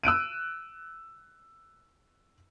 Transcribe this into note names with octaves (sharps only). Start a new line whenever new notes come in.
E6 F#6 D7 D#7